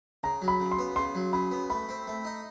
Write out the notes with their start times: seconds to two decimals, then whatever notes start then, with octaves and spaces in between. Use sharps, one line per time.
0.23 C#3 A#5
0.42 F#3
0.48 B5
0.60 C#3
0.71 C6
0.79 B3
0.96 C#3 C6
1.15 F#3
1.33 C#3 B5
1.51 B3
1.70 A3 B5
1.89 C4
2.07 A3
2.25 D#4